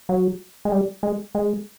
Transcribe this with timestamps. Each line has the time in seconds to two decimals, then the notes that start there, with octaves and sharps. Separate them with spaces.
0.09 F#3
0.65 G#3
0.72 G3
1.03 G#3
1.35 G#3